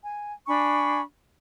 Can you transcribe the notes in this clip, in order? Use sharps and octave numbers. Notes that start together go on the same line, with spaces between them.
G#5
D4 G#5 B5 C#6